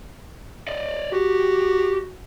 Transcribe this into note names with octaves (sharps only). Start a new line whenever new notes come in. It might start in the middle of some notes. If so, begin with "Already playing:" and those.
D5 D#5
F#4 G4